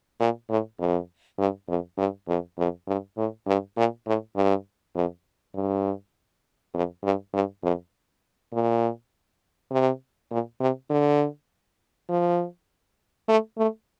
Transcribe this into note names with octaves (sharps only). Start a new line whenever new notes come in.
A#2
A2
F2
G2
F2
G2
F2
F2
G2
A2
G2
A#2
A2
G2
F2
G2
F2
G2
G2
F2
A#2
C3
A#2
C3
D3
F3
A3
A3